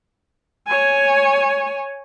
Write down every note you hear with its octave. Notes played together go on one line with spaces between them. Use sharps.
C#5 G#5